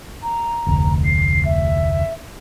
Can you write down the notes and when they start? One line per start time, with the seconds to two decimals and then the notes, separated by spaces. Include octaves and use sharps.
0.23 A#5
0.67 F1 D2
1.05 C7
1.45 E5